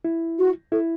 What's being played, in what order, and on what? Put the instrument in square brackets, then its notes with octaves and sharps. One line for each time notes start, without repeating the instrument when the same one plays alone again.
[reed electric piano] E4
[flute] F#4
[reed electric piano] E4 [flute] A4